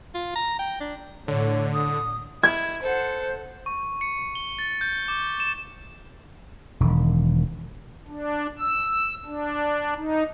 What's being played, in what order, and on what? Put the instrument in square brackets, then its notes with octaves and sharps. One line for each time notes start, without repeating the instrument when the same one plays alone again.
[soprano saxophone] F4
A#5
G5
D4
[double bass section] A2 [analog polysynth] D3 [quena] C#5
[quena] D#6
[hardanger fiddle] E4 [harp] G#6
[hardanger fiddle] A4 F#5 [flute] C5
[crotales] C#6
C#7
G7
A6
G6
D6
E7
[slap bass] E1 D#3
[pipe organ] D4
E6
D4
D#4